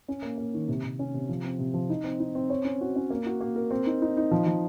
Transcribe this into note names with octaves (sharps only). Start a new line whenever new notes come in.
C#4
A#3
A#3
D#3
C3
C3
C#4
C3
F3
C4
C3
F3
D#4
C4
D#4
C4
C#5
C#4
F#4
C#4
A#3
F#4
A#3
A#4
C4
D#4
D#4
D#4
F3
F3